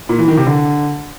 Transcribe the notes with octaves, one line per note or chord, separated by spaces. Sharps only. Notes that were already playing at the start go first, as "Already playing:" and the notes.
A#2
E3
D#3
C3
D3